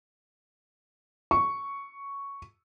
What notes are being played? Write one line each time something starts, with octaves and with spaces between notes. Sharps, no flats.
C#6